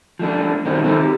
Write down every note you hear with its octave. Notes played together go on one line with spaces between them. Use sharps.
F3 A3 D4
F#2 B2 D#3 G3 C4
D#3 C4 D#4 A4 C5
G4